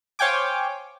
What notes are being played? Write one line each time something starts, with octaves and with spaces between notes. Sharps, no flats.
C5 C#5 F5 G5 G#5 D6